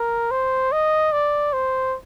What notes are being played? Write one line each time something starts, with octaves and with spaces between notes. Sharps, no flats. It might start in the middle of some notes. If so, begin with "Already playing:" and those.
Already playing: A#4
C5
D#5
D5
C5